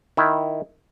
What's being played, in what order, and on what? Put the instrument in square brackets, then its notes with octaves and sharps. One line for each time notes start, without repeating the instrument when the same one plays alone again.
[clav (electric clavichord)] D#3 E4